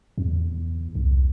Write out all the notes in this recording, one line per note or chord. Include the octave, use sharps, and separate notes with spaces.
E2
C2